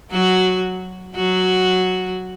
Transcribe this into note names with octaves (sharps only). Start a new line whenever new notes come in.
F#3 F#4
F#3 F#4